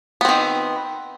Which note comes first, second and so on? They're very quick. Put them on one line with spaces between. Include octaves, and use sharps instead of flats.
B3 C4 D#3